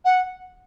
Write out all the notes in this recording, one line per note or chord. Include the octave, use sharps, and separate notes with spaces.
F#5